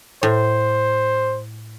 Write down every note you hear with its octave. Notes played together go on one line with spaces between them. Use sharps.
A2 C5